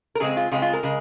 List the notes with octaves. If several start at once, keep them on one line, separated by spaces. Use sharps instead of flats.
A#4
C#3 G#3 C4 G#4
F4
C#3 G#3 C4 F4
F4
A#4
C#3 G#3